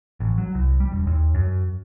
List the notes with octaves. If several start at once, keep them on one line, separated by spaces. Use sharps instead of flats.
A1
F#3
C2
G3
E1
D#2
F#2